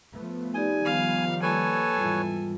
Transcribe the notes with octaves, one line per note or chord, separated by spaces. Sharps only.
F3 A3 B3
D#4 G4 D5 G#5
D#3 F3 G3 B3 F5
A#3 A4 B4 C#5 G#5
E2 G#2 E3 G3 F4